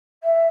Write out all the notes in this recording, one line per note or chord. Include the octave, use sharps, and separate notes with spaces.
E5